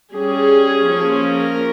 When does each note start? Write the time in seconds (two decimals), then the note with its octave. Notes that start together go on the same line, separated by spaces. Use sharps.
0.13 G3 C#4 G#4
0.87 F3 A#3 C#4
1.24 A#4